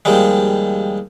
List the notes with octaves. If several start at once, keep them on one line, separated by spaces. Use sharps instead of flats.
D#2 F3 G3 G#3